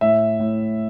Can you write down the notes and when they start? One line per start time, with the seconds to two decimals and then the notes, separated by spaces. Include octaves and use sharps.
0.01 A2 E5
0.39 A2